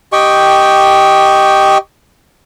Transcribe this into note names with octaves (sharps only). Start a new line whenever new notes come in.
G4 D#5 G5 C#6